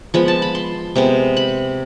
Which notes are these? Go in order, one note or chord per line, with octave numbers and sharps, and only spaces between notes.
F3 G#3 B3 B5
A5
B5
C6
C3 G#3 B3
B5